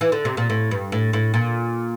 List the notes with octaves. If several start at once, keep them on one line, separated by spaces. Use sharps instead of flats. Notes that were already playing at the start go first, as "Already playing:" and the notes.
E3
D3
C3
A#2
A2
G2
A2
A2
A#2